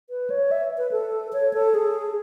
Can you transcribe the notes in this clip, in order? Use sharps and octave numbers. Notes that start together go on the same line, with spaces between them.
B4
C#5
E5
B4
A4
C#5
A4
G#4